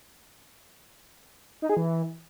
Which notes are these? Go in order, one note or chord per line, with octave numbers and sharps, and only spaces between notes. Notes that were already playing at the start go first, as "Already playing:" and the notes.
D#4
G#4
E3